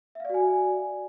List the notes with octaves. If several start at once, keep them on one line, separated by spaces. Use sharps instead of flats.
F#4 D5 E5 F5 G#5